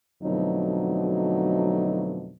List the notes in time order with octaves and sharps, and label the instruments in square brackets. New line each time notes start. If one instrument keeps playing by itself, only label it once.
[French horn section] F2 B2 D3 F#3 A3 D#4